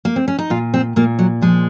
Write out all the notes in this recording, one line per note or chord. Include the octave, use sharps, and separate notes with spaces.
A#3
C4
C#4
D#4
A#2 F4
C4
A#2 A#3
F#3
F3 G#3